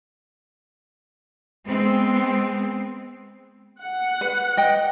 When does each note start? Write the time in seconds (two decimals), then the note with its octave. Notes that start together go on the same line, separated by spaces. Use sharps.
1.66 G#3 B3 C4
3.81 F#5
4.21 B4
4.57 D#5 G5